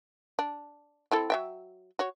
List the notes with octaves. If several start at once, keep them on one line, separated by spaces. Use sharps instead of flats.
D4
C4 E4 A4
F#3 E5 G5
F#4 C#5